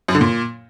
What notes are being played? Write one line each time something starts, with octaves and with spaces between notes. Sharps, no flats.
F#2
D3
A#2